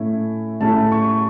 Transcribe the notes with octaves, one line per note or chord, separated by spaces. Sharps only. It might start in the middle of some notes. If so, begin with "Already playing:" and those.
Already playing: A2 A3 C#4 E4
A2 A3 C#4 E4 A5
C#6